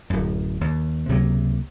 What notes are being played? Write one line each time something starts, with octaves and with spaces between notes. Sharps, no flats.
D1 F#2
D#2
C#2 C3 F#3 A#3